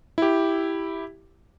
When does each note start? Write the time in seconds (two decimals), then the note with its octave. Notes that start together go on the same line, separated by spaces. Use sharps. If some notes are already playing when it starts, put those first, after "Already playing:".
0.18 E4 G4